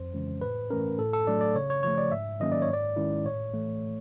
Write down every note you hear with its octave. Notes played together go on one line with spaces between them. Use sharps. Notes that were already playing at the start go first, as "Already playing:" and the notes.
Already playing: F2 C5
C#3 E3 G#3 C#4
A2 B4
E3 A3 C#4 A#4
A2 A4
A4
F#3 A3 D4 D5
D5
C#3 C#5
C#5
F3 A3 C#5
D5
G#2 E5
D#3 F#3 A#3 C#4 D#5
D5
C#5
G#2
D5
D#3 G#3 C#4 E4
A2 C#5
E3 A3